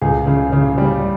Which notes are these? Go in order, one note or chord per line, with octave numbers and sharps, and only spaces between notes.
C#2 G#4
C#3
C#3
G3